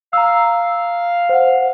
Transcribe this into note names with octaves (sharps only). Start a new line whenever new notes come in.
F5 A#5 E6
C5 F#5